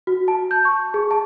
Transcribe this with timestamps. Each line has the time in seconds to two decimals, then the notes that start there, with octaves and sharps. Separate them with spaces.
0.07 F#4
0.28 A5
0.51 G6
0.65 C#6
0.94 G#4
1.11 A5